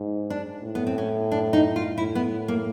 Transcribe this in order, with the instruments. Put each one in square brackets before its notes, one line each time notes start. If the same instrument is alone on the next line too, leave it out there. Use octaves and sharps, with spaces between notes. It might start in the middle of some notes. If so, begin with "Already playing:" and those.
Already playing: [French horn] G#2
[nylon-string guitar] D4
[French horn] A2
[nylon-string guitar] B3
C4
C#4
D4
D#4
F4
[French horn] A2 [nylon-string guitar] E4
[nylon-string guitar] B3
A#3